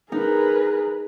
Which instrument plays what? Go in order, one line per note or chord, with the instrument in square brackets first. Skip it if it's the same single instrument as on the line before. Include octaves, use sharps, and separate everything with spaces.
[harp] D#4 [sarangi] G#4 [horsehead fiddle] A#4 B4